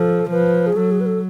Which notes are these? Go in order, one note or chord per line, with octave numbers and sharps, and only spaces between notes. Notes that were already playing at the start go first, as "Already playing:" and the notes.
Already playing: F3 A4
F3 B4
G#4
F#3 A4
G#4
B4
A4